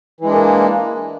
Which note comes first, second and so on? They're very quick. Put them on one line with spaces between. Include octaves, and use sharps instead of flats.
E3 G#3 D4 A#3